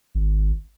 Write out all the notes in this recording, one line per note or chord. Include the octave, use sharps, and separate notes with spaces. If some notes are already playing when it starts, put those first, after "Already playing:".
G#1